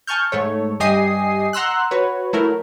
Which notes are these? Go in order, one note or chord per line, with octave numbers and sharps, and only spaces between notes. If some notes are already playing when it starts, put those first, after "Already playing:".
G#5 A5 C#6 F6 G6
G#2 A3 C#5
G2 G4 D#5 G#5 D#6 C7
F#5 A#5 C6 E6 F#6
F#4 B4 C#5
F#3 A3 E4 A#4